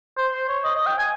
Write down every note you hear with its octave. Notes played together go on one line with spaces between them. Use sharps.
C5
C5
C#5
D#5
D#5
G5
G#5